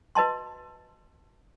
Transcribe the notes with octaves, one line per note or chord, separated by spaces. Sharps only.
F#4 B4 D#5 A5 C6